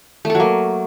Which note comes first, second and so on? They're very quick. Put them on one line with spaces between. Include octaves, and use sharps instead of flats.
A3 A4 F#3 A#3